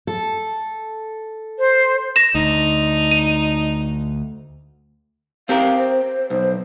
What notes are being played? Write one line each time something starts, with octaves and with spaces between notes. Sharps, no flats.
A4
C5
A#6 E7
D2 D#4
D#7
C4 G4 A#4 F5
C5
B1 C5